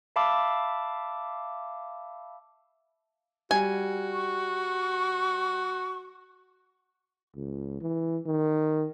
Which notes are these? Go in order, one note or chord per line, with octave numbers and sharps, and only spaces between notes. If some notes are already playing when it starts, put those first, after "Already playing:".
E5 F5 A5 B5 D6 E6
G3 F#4 G#5
C#6
C#2
E3
D#3